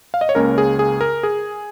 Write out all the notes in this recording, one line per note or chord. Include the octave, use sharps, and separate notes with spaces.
F5
D#5
C#5
C#2 C#3 A#3 C#4 A#4
G#4
G#4
A#4
G#4